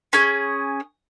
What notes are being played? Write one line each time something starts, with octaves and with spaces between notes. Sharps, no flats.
C#4 G#4